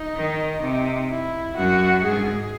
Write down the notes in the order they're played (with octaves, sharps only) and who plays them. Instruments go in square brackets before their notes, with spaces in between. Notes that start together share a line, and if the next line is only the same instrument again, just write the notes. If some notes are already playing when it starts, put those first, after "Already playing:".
Already playing: [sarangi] D#4
[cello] D#3
C3
[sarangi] E4
[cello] F#2 [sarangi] F#4
[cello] G#2 [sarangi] G#4